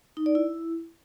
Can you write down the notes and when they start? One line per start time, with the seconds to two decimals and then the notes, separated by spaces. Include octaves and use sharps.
0.17 D#4
0.26 D5
0.35 E4